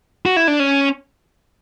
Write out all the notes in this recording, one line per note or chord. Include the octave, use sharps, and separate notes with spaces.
F#4
E4
D4
C#4